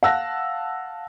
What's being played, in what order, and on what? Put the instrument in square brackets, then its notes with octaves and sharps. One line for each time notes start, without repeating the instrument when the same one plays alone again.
[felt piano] F5 F#5 A5 E6 F#6 A#6